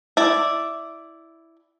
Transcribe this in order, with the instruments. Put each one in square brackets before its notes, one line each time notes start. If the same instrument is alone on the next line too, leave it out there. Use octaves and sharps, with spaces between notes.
[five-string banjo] E4 D5